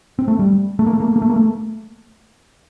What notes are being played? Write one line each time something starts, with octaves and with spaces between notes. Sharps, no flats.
C4
A3
G3
A3
A#3
A3
A#3
A3
A#3
A3
A#3
A3